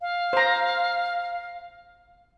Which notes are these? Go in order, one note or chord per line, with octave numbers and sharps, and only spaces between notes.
F5
C5 A#5